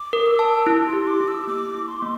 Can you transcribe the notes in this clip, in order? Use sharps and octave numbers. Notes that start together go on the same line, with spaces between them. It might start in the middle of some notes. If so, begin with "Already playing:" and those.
Already playing: D6
A#4
E6
A5
E4
C6
G4
D6
E4
E6
A#3 D6
E4
C6
A#3